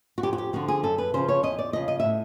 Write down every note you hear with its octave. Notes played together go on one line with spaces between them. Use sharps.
F#4
F2 G4
F#4
G4
D3 F3 F#4
G#4
F#2 A4
B4
C#3 F3 C5
C#5
E2 D#5
D5
C#3 F3 D#5
D#5
A2 E5